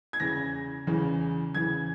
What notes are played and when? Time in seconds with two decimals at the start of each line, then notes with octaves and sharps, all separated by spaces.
0.13 G#6
0.20 E2 C#3 E3 A#6
0.87 E2 C#3 E3
1.54 E2 C#3 E3 G#6